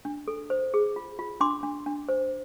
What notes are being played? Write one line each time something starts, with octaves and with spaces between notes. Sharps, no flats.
D4
A4
C5
G#4
F4
F4
D4 C6 D6
D4
D4
C5